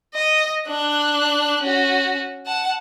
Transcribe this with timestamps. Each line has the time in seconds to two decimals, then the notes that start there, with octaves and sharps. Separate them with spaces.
0.14 D#5
0.67 D4 F#6
1.63 C#4 F#4
2.46 F#5 A5